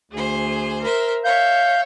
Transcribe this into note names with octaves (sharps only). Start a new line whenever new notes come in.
D2 G#4 C5
A#4 C5 E5
C#5 E5 F5 G6